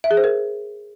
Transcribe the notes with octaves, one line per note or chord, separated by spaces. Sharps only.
E5
G#4
C5
A#4